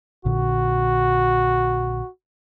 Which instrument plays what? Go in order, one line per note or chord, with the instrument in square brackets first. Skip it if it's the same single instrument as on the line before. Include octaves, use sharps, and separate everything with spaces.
[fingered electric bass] A#1 A#2 D3 [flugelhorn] F#4